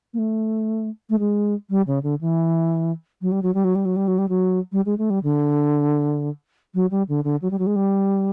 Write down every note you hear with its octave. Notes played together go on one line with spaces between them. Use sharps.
A#3
A3
A3
G#3
G3
C#3
D3
E3
F#3
G3
F#3
G3
F#3
G3
F#3
G3
F#3
G3
F#3
G3
G#3
A3
G3
D3
F#3
G3
D3
D3
F#3
G3
F#3
G#3
G3